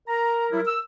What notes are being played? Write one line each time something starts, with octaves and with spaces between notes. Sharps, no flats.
A#4 A#5
F#3 G3 E4
E6